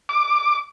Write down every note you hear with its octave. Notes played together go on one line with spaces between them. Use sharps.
D6